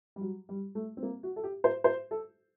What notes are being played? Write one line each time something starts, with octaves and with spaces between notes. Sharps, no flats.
G3
F#3
G3
A3
C4
A#3
F#4
A4
G4
C5
C5
A4